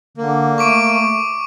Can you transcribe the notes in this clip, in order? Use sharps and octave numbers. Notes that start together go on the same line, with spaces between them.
D3 A#3
A3 C#6 D6 D7